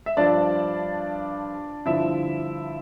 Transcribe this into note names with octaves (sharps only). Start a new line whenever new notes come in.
E5
G2 F3 D4 D5
G2 D3 F3 E4 E5